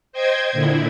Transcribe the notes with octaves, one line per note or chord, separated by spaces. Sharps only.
C5 D#5 G5 G#6
A#2 D3 E4